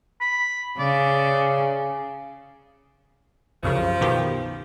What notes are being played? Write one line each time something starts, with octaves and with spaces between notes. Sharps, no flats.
B5
C#3 D5
C2 F#2 C#3 F3
B2 D#3 G4